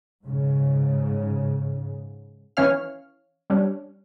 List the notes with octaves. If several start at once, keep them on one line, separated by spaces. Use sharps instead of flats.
G#2 C#3
E3 C#4 C#5 F5 F6
G3 C#4 D4